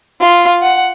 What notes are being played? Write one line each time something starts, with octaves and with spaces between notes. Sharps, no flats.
F4
F#5